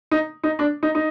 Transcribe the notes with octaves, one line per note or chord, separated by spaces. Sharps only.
D#4
D#4
D4
D#4
D#4